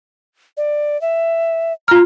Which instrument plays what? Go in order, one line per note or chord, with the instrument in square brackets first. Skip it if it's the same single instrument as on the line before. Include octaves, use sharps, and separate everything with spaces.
[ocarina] D5
E5
[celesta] F4 F6 [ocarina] A#5